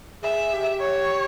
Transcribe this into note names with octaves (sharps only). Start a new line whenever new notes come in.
G#4 E5
G4
C#5